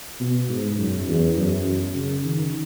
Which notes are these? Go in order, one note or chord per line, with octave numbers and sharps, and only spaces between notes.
B2
G#2
F#2
E2
F#2
F#2
C#3
D#3